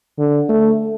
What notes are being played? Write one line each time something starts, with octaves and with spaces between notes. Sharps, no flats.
D3
A3